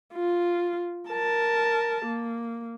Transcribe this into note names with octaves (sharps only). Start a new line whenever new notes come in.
F4
A#4 A5
A#3